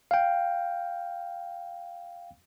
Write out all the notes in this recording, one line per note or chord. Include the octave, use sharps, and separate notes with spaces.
F5 G5